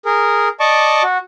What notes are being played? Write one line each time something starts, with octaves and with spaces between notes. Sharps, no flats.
G#4 A#4
D5 D#5 A5 C#6 D6
F#4